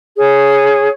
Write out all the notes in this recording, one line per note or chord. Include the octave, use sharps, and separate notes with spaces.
G#4 C#5